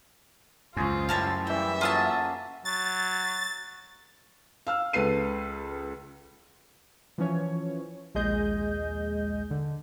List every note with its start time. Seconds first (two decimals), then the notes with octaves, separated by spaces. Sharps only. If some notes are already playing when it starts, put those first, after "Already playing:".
0.77 C#2 F#2 C#4 F4 G#4 C5
1.09 F#2 A2 G3 E5 G#5 A5 F6
1.47 C#3 E3 G3 E5 G5
1.81 F#3 A#3 F4 G#4 A4 A5
2.65 F#3 A6
4.67 F5 E6 F6
4.93 C#2 A4 B4 C7 D#7
7.18 E3 F3 C#4 C#5
8.15 A#1 D#2 G#3 G#4 D#5 G6
9.51 D3